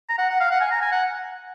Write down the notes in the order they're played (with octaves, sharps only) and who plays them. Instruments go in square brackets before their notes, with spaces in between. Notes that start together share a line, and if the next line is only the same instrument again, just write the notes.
[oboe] A#5
F#5
F#5
F5
F#5
G#5
A#5
G#5
F#5